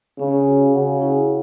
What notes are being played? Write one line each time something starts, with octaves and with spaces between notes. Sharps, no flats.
C#3 C#4
F#4
C#3 F#5
E4